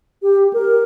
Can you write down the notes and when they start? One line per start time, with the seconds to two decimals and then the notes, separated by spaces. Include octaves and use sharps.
0.22 G4
0.53 A#4